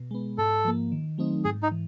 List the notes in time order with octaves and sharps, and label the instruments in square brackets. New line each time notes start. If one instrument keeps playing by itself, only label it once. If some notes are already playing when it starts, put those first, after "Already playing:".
Already playing: [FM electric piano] B2
G#3 B3
[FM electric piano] G#2 [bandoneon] A4
[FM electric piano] F3 A#3
D#3
F#3 A3 C4 D#4
[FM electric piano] G#2 [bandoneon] G#4
[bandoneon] D#4
[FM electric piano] E3